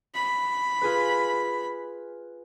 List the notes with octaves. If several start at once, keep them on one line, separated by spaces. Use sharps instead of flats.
B5
F4 G#4 B4